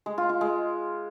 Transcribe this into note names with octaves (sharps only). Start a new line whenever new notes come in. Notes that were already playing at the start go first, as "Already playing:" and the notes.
G#3
F4
F4
G#3